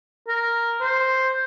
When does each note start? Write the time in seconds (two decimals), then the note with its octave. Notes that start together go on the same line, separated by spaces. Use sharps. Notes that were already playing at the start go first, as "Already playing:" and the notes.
0.28 A#4
0.81 C5